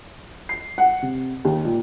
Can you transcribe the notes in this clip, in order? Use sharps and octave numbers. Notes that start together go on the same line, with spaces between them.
C7
F#5
C3
D#2
A#2